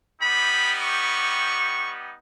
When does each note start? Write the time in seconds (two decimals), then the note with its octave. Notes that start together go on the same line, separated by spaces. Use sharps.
0.21 G3 B3 D#4 G4 B5
0.81 C#6